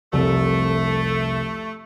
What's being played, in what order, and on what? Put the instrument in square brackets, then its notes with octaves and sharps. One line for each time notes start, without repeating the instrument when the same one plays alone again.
[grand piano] C2 F2 [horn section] A3